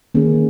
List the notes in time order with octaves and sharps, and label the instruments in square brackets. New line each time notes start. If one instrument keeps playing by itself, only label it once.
[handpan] D#3 A#3 C#4 G#4